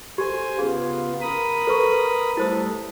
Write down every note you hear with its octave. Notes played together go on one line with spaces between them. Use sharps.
G4 A4 C5 G#5
C#3 B3 F4 G#4
A#4 B5 D#6
A4 B4 C#6
G3 A3 E4 A4 C5 D#6